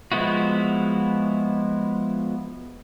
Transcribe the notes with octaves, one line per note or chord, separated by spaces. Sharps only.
F3 G#3 B3 E4 F#4